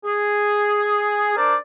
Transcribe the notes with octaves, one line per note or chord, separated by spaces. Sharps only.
G#4
D4 A#4 C5 D5